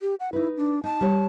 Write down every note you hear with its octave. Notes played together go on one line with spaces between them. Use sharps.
G4
F#5
D#4 E4 B4
D4
D#4 A5
G3 C#5